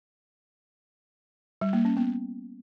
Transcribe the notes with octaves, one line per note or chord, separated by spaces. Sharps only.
G3
A#3
C#4
B3